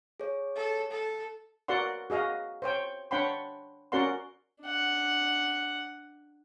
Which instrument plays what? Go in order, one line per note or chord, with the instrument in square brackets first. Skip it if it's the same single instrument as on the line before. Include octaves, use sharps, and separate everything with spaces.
[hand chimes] G#4 C#5
[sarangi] A4
A4
[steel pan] F#4 A#4 D5 F#5 C6
F#4 G#4 D#5 F5
C5 C#5 G5
D4 C#5 F#5 G5 B5 C6
C#4 F#4 A#4 D5 F#5 C6
[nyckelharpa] D4 F#5